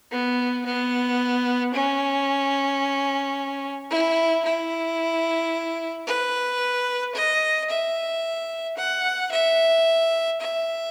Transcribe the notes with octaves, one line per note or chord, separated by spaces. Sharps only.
B3
B3
C#4
E4
E4
B4
D#5
E5
F#5
E5
E5